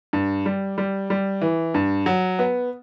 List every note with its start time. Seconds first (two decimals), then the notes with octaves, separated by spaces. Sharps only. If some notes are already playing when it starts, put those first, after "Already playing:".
0.13 G2
0.46 G3
0.78 G3
1.10 G3
1.41 E3
1.74 G2
2.06 F#3
2.39 B3